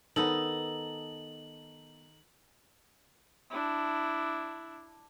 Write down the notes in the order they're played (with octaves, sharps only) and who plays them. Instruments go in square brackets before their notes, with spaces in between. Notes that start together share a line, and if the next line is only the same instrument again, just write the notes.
[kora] D#3 B3 [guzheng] D#4 A4 [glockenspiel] F#7
[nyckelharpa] D4 E4